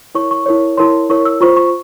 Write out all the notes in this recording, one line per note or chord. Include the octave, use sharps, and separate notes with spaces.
E4 A#4 C#5 C#6
C#6
E4 A#4 C#5
E4 A#4 C#5 C6
E4 A#4 C#5 C#6
E6
F4 C5 C#6
C#6